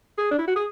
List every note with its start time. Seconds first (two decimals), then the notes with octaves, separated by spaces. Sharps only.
0.18 G#4
0.31 D4
0.39 E4
0.48 F#4
0.56 G#4